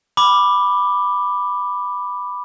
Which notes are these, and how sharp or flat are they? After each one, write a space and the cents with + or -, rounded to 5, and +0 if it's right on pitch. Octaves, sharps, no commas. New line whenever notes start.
B5 +0 D6 +5